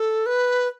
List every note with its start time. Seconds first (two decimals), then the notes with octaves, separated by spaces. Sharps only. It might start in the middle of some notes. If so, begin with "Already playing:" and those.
Already playing: A4
0.26 B4